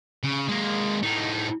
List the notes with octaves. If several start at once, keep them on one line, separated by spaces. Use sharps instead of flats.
C#3
G#3 A#3
A2 D#4